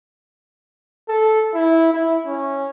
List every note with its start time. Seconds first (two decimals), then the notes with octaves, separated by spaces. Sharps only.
1.09 A4
1.54 E4
1.93 E4
2.27 C#4